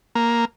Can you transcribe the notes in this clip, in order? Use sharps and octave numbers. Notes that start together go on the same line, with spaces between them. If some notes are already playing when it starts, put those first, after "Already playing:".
A#3